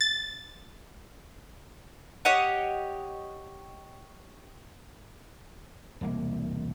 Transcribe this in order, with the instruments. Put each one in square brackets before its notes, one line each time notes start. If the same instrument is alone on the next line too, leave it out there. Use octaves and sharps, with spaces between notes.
[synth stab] A6
[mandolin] G4 C#5 D#5 F#5
[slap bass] E1 C2 A#3